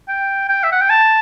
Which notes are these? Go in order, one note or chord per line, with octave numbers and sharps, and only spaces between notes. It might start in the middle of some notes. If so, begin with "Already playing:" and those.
G5
G5
E5
F#5
G5
A5